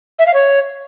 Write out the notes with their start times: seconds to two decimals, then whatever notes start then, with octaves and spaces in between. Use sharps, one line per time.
0.19 E5
0.26 F5
0.34 C#5